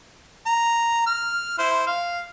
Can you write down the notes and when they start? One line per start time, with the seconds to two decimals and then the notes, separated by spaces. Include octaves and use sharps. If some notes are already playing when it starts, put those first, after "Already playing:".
0.46 A#5
1.07 F6
1.59 E4 C5
1.87 F5